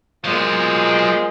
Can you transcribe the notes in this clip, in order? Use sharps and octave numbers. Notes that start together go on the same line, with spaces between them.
A#2 F3 F#3 G#3 B3